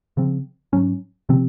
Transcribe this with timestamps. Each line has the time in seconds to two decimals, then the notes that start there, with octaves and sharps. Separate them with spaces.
0.17 C#3 F3 C4
0.73 G#2 F#3 C#4
1.29 C3 F3 C4